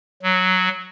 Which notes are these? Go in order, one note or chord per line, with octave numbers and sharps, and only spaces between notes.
F#3